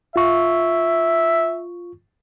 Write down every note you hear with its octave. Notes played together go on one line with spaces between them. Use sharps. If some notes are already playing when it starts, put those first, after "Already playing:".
F4 E5 C#6